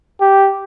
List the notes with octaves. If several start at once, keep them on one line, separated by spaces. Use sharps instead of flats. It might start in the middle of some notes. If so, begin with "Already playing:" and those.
G4